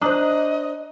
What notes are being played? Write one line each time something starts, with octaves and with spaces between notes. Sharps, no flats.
D4 C5 D#5 A#5 D#6 F#6